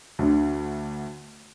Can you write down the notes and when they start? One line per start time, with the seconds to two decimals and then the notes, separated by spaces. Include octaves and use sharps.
0.19 D2 D3